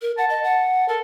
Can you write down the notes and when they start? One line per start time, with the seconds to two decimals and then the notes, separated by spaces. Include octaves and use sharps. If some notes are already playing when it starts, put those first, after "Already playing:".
0.02 A#4
0.18 F#5 A5
0.30 D#5
0.44 F#5
0.88 A4 A#4